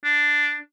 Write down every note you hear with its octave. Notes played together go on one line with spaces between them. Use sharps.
D4